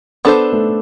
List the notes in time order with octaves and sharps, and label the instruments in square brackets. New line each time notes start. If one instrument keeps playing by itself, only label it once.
[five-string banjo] B3 D4 A4 C5
[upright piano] A3